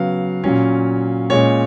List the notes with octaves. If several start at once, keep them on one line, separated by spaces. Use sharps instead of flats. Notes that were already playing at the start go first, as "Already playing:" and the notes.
Already playing: C#3 F#3 B3 F5
A#2 F#3 C#4
A#2 G#3 C#4 C#5